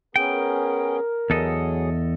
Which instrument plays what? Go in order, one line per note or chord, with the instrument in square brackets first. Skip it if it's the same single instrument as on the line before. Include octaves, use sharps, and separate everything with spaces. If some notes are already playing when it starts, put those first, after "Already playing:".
[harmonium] B3 C#4 G#4 [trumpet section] A#4 [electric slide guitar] G5
[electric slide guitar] E2 A4 D#5 [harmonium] F#3 G#4